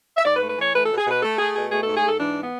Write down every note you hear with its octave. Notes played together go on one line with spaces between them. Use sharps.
E5
G#2 D5
B4
A3
B4
E3 C#5
A3 B4
B2 A4
G#4
B2 B4
A3 A4
A3 G#4
B2 G#4
A3 G#4
G#2 A4
G#4
G#2 A4
E3 D4
B3